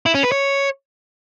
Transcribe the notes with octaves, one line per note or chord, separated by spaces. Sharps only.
E4
C#4
B4
C#5